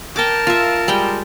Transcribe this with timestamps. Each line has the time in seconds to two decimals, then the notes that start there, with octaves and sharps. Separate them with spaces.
0.16 A#4 G5 A5 D6
0.47 F4 E5
0.88 G3 G#3 G5